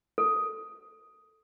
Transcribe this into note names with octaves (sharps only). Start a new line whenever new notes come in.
A4